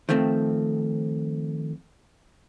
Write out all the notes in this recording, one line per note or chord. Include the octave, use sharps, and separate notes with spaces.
D#3 F3 A3 C4